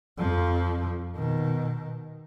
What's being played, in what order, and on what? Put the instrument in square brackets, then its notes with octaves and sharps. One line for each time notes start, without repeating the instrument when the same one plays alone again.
[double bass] F2 F3
B2 D#3